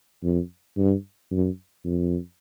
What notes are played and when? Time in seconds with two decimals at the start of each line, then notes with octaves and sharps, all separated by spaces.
0.23 F2
0.77 G2
1.31 F#2
1.85 F2